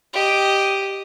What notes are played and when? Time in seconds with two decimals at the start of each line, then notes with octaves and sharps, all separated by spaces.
0.13 G4 D#5